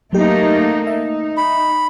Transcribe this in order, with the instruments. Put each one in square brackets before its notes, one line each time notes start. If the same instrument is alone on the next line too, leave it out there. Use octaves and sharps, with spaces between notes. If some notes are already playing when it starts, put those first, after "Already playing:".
[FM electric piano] F#3 G4 [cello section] A3 A#3 D#4
[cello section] D#4 [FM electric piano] E5
[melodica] B5